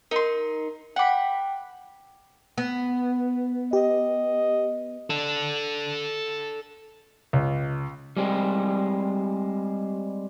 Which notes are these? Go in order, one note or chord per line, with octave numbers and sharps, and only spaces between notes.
D#4 A#4 C6
F#5 G5 B5 D6
B3
G4 D#5
A4 D5
C#2
G3 G#3 C4